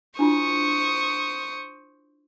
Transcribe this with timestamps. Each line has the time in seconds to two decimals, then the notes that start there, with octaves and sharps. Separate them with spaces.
0.19 D4 E4 F4 C5 C#6 D#6